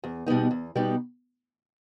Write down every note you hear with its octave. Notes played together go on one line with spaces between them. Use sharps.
E2
B2 G3 B3 D#4
E2
B2 G3 B3 D#4